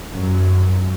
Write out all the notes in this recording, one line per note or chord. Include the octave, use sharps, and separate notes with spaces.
F#2